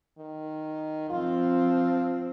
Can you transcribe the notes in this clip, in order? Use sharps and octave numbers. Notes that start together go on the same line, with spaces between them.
D#3
F3 C4 F4